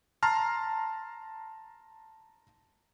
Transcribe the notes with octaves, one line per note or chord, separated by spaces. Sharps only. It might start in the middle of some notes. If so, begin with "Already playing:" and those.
A5 A#5 C6 F6